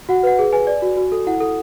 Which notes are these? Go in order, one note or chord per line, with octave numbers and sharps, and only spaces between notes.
F#4 F#5
B4 F#5
G#4
B4 G#5
D5
F#4
F#4
A4
E4 F#5
A4